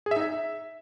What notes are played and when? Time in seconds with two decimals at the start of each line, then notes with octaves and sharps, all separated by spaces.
0.06 G#4
0.11 E5
0.16 D#4
0.21 E5